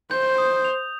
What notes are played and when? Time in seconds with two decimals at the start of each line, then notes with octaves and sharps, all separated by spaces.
0.11 C5 G6
0.38 D#6
0.65 F7